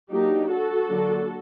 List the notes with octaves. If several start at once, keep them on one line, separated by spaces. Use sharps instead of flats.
F#3 A#3 D4 D#4 G4
F#4 A4
D3 F#3 A#3 D4